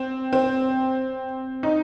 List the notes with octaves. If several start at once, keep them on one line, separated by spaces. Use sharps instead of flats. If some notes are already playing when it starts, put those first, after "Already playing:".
Already playing: C4
C4
D#4